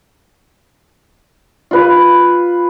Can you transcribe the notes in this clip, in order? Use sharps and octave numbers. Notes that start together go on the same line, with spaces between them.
F4 B4